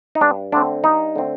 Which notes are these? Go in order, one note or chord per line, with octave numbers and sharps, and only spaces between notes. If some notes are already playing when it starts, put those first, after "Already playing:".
D#4
G2 D4
D3 A3 C4 D4
G2 D#4
D3 A3 C4